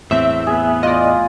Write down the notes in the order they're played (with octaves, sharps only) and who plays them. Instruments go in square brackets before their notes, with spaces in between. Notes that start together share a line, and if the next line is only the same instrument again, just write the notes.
[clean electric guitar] E2 A2 [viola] C4 [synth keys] E5
[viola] B3 [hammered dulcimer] G#4
[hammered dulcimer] F4 [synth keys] D5 D#5